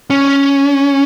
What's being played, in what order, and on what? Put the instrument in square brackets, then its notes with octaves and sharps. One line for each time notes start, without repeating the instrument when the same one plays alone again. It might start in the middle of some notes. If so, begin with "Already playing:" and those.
[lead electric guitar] C#4